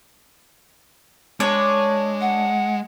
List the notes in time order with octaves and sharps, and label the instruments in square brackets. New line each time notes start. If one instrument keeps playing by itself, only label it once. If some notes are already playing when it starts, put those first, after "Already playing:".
[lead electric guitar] G#3 [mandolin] D4 C#5
[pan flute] F#5